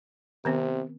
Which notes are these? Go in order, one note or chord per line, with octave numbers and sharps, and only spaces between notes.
C3 D#3 B3 C4